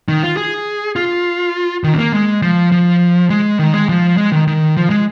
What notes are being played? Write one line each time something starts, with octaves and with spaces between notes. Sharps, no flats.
D#3
F4
G#4
F4
D#3
C#4
A#3
G#3
F3
F3
G#3
D#3
G#3
F3
G#3
D#3
D#3
F3
G#3